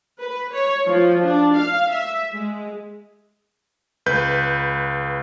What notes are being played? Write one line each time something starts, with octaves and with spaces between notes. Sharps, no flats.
B4
C#5
F3
D4
F5
E5
G#3
C#2 B4 G6